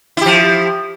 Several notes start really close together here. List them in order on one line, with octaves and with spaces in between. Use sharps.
E4 G4 F3